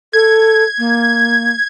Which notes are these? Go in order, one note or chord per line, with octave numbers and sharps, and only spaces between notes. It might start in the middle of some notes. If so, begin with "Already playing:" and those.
A4 G#6
A#3